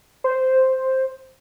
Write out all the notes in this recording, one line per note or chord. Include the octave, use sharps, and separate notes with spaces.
C5